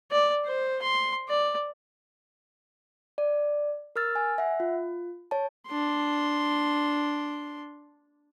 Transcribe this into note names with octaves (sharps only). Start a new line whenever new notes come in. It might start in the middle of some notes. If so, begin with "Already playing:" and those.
D5
C5
C6
D5
D5
A#4 E6 F6 A6
G#5
E5 F#5
F4
C#5 A5
D4 C6